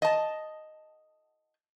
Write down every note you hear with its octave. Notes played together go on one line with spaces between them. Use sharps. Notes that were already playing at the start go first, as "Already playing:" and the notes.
D#5 A5